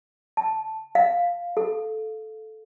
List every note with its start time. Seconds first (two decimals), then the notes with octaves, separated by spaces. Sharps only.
0.37 A5
0.95 F5
1.57 A4